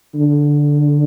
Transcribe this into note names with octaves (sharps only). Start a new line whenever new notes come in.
D3